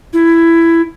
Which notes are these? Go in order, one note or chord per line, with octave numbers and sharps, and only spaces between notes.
E4